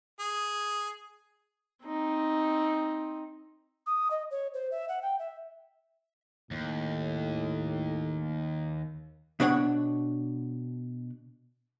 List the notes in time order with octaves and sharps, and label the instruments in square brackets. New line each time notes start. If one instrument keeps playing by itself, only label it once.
[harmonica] G#4
[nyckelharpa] C4 D#4
[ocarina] D#6
D#5
C#5
C5
E5
F#5
G5
E5
[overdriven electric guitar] D#2 [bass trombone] A2
[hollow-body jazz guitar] B2 D4 C#5 F#5